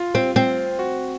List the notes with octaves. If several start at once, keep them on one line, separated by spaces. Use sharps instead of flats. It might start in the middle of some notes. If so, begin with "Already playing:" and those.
Already playing: F4
C4
C4
F#4